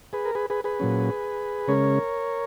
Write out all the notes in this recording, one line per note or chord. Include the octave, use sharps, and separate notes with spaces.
G#4 B4
A#4
G#4 B4
G#4 B4
G#4 B4
A#2 F#3 C#4
C#3 G#3 C#4 A#4 C#5